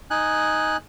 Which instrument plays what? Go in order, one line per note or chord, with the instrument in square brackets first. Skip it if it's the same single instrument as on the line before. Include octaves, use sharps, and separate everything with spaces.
[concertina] D#4 G#5 F#6